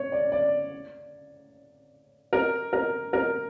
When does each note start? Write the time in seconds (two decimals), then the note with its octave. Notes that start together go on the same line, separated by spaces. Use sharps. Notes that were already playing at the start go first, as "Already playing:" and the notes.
Already playing: C#5
0.12 D5
0.32 D5
2.33 A#4
2.73 A#4
3.13 A#4